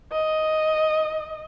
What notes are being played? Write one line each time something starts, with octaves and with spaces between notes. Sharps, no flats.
D#5